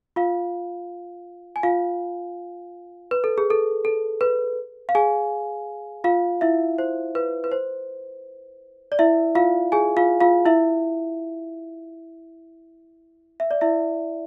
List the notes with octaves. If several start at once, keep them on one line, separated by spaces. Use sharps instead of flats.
F4 F5
G#5
F4 F5
B4
A4
G#4
A4
A4
B4
F5
G#4 G#5
F4 F5
E4 E5
C5
B4
B4
C5
D5
E4 E5
F4 F5
G#4 G#5
F4 F5
F4 F5
E4 E5
E5
D5
E4 E5